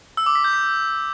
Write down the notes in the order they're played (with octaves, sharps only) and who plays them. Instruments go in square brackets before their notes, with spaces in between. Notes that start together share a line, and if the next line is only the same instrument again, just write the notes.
[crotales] E6
D6
B6
G6
B6